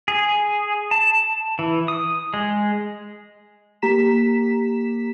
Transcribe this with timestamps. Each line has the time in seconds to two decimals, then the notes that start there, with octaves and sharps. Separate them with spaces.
0.08 G#4
0.91 A5
1.59 E3
1.88 D#6
2.34 G#3
3.82 A#3 G4 A#5 B6 E7